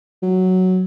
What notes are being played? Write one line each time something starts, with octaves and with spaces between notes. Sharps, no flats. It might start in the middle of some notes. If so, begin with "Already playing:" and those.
F#3